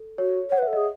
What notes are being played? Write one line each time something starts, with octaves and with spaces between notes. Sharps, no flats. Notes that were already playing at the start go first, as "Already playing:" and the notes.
Already playing: A4
F#4 C#5
C#5 F#5
B4
A4 E5
G#4 D#5